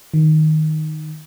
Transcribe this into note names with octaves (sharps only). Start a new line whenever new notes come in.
D#3